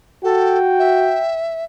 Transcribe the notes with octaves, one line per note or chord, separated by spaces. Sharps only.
F#4 A4 G5
E5